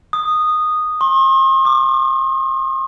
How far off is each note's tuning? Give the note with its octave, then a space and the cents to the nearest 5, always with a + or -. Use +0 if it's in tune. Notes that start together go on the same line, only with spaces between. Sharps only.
D#6 -10
C6 +40
D6 +40